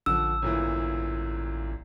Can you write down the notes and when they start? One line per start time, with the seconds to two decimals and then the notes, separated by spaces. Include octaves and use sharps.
0.06 A1 D3 F3 E6
0.42 G1 A#2 E3